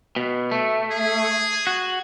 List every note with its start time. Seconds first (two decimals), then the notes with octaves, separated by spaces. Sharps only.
0.16 B2
0.51 A3
0.91 G#4
1.67 F#4